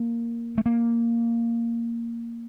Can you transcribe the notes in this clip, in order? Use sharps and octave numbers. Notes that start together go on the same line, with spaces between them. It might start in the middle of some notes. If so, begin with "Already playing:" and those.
Already playing: A#3
A3
A#3